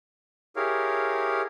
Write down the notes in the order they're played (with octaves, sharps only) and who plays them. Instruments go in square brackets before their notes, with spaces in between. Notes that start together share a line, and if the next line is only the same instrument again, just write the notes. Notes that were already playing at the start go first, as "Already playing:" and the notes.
[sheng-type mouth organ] E4 G4 G#4 A#4 C#5 F5